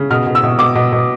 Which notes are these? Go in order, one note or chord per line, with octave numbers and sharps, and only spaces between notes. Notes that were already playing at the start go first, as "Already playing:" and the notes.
Already playing: C#3
B2 F6
B2
E6
B2
B2 D6
B2
B2